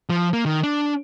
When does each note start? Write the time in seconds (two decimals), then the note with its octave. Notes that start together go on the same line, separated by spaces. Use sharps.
0.10 F3
0.33 A#3
0.46 D#3
0.63 D4